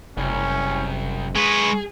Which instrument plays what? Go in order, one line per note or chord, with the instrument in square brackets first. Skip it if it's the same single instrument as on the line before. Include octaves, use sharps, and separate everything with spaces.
[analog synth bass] F#1 [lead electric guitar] C2 [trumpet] C#4
[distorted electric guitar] G#3 B4 [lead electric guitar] G#4 [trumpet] C#6